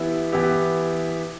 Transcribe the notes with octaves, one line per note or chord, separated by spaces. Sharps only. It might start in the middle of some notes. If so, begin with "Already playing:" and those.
Already playing: E3 B3 E4 G4
E3 B3 E4 G4